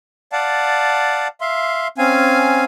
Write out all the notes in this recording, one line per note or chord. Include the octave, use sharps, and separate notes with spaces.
D5 F5 F#5 A5
E5 F5 C6
C4 C#4 F5 G#5